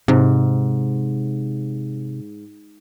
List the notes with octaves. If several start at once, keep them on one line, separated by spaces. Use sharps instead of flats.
G#2 C3